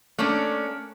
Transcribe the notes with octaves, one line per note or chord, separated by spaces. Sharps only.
A3 A#3 C#4 D4